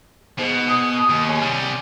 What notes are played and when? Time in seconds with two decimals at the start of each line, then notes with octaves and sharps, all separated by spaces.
0.39 G#2 B2
0.68 G#5 D#6
1.09 D#2
1.28 C#5 G#5
1.41 C3 G3